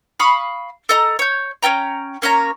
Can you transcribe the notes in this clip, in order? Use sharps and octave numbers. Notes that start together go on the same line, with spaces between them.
F5 B5 C#6 D#6
A4 D#5 A#5
C#5 G6
C#4 D#5 G5 A#5
A#3 C#4 C#5 A#5